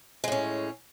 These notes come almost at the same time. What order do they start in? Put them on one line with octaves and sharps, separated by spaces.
G#3 A2 C#4